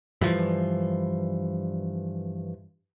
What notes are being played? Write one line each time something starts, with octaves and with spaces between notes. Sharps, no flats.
G2 E3 F3